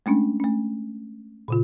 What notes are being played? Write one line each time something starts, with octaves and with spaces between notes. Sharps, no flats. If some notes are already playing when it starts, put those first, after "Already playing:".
G#3 A3 C#4 D4
A3 C#4
A#2 C#3 F4